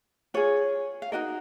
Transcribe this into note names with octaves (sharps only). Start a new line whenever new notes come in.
F4 G#4 C#5
F5
D#4 F#4 A#4 D#5